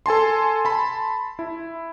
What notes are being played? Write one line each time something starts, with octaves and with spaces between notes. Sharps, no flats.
A4 G#5 A5 C6
A5 B5 C6
E4